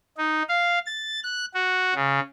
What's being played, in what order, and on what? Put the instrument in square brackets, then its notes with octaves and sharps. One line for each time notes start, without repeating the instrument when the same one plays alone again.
[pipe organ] D#4
F5
A6
F#6
F#4
C#3